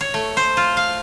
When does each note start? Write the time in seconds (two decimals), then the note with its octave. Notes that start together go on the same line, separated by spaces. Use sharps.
0.01 C#5
0.14 A3
0.37 C5
0.57 F4
0.77 F5